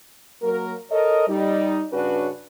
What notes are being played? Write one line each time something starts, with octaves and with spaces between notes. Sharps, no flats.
F#3 A#3 A#4
A4 A#4 C#5 D#5
G3 D#4
G2 C#3 C#4 D4 F#4 B4